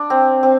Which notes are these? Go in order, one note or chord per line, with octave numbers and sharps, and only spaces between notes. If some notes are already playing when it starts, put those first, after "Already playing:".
Already playing: D4
C4
C4